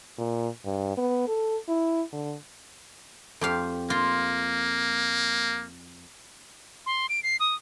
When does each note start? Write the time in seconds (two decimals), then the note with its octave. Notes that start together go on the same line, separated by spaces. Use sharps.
0.18 A#2
0.65 G2
0.97 B3
1.28 A4
1.68 E4
2.12 D3
3.41 F2 G4 F5
3.90 A#3 F4
6.86 C6
7.09 D7
7.23 C7
7.40 D#6